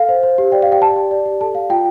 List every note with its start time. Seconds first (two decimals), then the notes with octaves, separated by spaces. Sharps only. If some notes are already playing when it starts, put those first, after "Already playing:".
Already playing: A4 F5
0.09 C5
0.23 C5
0.38 G4
0.52 D5 G5
0.62 G4 F5
0.72 G5
0.81 D5 A5
0.96 G4
1.11 D5
1.26 G4
1.41 A4 A5
1.55 D5 F5
1.70 F4 G5